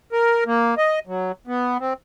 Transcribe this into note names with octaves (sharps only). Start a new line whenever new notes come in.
A#4
A#3
D#5
F#3
B3
C4